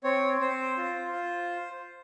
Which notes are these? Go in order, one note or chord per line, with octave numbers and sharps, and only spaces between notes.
C4 C#5
C4 C5
F4
F4